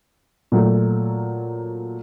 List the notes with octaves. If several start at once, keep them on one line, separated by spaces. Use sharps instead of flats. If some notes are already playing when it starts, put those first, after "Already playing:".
A#2 F#3 A3